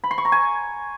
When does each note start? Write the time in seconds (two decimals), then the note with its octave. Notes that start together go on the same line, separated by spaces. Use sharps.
0.04 B5
0.11 C6
0.18 C#6
0.25 A#5
0.32 G#5